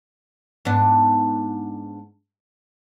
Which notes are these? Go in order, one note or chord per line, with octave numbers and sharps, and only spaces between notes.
G#2 B3 D4